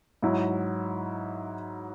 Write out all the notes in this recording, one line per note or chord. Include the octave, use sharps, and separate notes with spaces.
G#2 F#3 E4